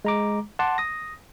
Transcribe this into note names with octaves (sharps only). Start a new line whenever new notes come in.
G#3 A#5 D6
F#5 A5 C6 D6
D#6 A#6